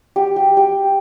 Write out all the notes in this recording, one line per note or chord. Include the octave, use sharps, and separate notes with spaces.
G4
G4
G4